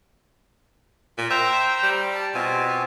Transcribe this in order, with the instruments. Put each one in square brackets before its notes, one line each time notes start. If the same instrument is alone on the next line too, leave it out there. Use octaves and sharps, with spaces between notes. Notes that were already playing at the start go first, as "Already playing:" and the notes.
[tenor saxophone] A#2
[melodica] C5 G5 A#5 [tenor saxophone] E5
[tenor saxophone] G3
[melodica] A5
[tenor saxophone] B2 [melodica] C4 F4 G#5